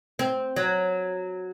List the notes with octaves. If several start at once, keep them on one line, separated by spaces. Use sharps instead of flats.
C4
F#3